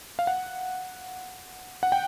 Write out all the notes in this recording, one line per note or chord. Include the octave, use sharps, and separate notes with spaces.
F5
F#5
F#5
G5